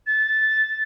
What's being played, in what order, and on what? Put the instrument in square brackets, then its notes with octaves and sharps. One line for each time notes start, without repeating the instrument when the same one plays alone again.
[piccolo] A6